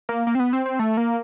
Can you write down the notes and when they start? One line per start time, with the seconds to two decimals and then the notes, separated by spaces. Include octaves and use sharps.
0.09 A#3
0.27 A#3
0.35 C4
0.40 B3
0.53 C4
0.66 C4
0.79 A3
0.97 A#3